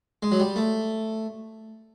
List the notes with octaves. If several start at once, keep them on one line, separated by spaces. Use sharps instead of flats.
G#3
F#3
G3
A3